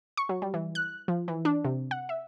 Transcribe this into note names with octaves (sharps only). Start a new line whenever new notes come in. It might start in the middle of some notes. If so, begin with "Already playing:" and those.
C#6
F#3
G3
E3
F#6
F3
E3
D4
C3
F#5
E5